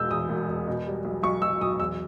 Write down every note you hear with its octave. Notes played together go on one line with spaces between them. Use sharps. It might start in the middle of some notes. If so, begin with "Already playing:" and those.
Already playing: E1 B2 G#3 E6 G6
E2 D#6
E1
E2
B2
G3
B1
B1 C#6
B1 E6
B1 D#6
E2 E6